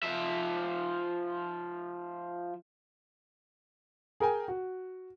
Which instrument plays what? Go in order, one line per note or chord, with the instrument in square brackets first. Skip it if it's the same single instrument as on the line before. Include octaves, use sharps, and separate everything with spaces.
[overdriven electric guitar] F3 E5
[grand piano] G#4 A#4 G5 G#5
F#4